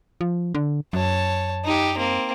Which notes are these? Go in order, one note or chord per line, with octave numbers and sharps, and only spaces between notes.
F3
D3
F#2 C#5 A5
D#4 G4
A#3 C4